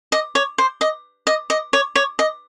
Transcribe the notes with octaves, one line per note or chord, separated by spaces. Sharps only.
D#5
C#5
C5
D#5
D#5
D#5
C#5
C#5
D#5